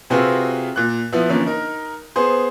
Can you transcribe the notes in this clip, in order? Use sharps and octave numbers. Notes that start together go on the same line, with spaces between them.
C3 C4 F4 F#4 G#4 B4
A#2 F#6
F3 B3 E4
D3 E3 F3 A#3 C#4
D#4 A#4
B3 G#4 C5